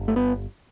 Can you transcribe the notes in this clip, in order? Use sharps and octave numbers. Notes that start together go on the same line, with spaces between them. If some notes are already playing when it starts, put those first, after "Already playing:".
Already playing: G1
A3
B3